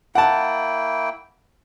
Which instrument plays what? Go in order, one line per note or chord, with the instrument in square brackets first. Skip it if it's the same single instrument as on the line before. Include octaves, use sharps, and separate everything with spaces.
[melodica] A#3 E4 G5 [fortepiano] F#5 A5